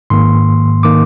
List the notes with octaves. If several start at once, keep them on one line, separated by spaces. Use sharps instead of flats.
G#2 D#3 A#3 C6
D#3 A#3 D6